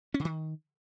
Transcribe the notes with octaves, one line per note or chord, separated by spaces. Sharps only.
C#4
C#3
D#3